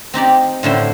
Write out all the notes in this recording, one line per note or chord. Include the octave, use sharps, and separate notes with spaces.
C4 D#4 G4 D5
A2 D3 E4 C5